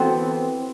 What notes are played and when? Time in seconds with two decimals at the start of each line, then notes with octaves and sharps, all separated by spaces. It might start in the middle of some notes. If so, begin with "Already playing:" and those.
Already playing: E3 B3 C4 F#4 A4 C5